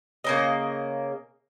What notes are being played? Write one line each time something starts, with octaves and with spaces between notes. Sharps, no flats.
C#3 A#3 D#5